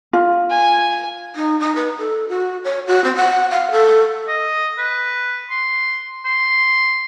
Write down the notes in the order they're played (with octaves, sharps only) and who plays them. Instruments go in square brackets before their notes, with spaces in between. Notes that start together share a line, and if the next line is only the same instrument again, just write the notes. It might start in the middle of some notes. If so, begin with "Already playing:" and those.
[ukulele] F4
[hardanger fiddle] G#5
[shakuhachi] D#4
D#4
B4
A4
F#4
C#5
F#4
C4
F#5
F5
A4
[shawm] D#5
B4
C6
C6